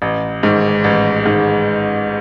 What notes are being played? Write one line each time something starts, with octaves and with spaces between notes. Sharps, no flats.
A1
G#2 D#3
A1
G#2 D#3